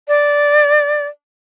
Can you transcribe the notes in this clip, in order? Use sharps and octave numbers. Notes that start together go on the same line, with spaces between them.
D5